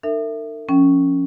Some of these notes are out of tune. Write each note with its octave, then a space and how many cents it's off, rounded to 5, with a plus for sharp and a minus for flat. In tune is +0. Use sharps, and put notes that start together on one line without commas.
D#4 -45 A#4 -45 E5 +0
F3 +5 C#4 +0 G5 -20